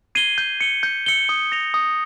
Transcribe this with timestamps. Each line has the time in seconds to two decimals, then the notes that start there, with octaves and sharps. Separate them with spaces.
0.15 G#6 C7 D#7 G7
0.38 G6
0.61 C#7 G7
0.83 G6
1.06 C#7 G7
1.29 D#6
1.52 A#6 F7
1.74 D#6